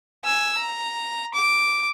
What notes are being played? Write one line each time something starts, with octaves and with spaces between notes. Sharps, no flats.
G#5 E6
A#5
D6